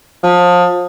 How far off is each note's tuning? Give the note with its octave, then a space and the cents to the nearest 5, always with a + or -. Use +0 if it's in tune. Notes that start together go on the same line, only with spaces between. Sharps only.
F3 +25